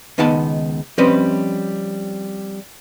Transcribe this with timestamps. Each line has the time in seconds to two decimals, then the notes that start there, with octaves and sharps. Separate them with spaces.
0.18 C#2 D#3 B3 D#4 F#5 A5
0.98 F3 G3 C4 C#4 B4 D#5